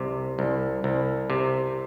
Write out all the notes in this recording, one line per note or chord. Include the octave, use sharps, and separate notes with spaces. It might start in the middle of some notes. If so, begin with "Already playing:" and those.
Already playing: C2 C3
C2
C2
C3